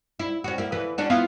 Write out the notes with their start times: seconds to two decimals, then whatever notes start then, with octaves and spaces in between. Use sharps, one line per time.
0.19 E4
0.44 C#4 F#4
0.58 A#3 E4
0.72 E2 E3 B4
0.98 C#4 D4 F#4
1.10 B3 E4 F4